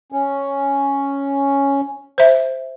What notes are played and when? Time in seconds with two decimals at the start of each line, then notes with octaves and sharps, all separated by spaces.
0.12 C#4
2.18 C5 E5